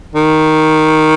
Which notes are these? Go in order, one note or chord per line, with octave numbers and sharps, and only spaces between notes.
D#3